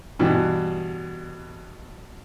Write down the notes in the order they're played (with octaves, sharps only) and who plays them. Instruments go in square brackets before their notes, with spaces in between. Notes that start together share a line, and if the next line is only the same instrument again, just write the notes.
[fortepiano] G2 B2 E3